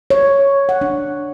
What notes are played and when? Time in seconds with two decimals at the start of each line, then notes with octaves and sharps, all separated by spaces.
0.10 C#5
0.69 F#5
0.81 D4